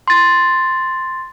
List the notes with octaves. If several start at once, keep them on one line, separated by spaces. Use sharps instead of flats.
C6 A6